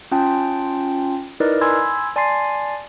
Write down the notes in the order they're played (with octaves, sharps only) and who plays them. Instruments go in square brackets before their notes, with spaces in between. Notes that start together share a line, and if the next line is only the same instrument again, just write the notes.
[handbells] C#4 F4 G5 A5
D#4 E4 A#4 B4 D5 D#5
G#5 B5 C6 E6 G#6
D5 G#5 A5 C6 A6 C7